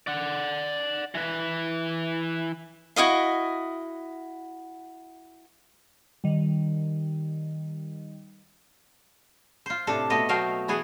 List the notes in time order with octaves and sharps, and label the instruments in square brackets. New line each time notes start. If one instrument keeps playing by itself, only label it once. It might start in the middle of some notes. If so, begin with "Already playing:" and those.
[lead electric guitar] D5 F#5
E3 B4
[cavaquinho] E4 F#4 D#5 F5
[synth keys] D#3 G3
[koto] F4 C5
A2 C3 D4 A4 A5
B2 A3 B3 D#5
B2 F#3 A3 F5 G5
E3 B3 G#4 F#5